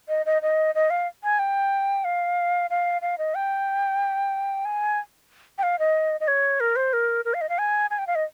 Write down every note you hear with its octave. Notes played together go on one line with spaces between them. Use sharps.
D#5
D#5
D#5
D#5
F5
G#5
G5
F5
F5
F5
D#5
G5
G#5
G5
F5
D#5
D#5
C#5
A#4
C5
A#4
A#4
F5
D#5
F5
G#5
G#5
G5
F5
D#5